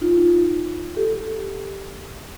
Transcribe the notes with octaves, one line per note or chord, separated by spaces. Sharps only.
D#4 F4
D#4 F4
G4 A4